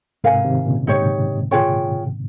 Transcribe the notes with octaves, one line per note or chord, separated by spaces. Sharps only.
G#2 C3 A#4 F5 G#5
C3 D#3
A#2 C#3
G#2 D#4 G4 C#5
F4 G#4 C#5 G5